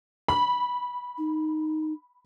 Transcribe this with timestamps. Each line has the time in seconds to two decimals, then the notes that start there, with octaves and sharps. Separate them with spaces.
0.28 B5
1.18 D#4